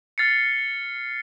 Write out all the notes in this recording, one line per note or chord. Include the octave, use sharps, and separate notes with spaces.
F6 A6 C7 C#7